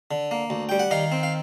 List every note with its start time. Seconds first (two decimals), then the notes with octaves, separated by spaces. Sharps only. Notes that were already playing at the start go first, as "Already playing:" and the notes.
0.11 D3
0.31 A#3
0.50 D2
0.69 G3 G5
0.79 F#5
0.91 D#3 D#5 F5
1.12 C4
1.23 F5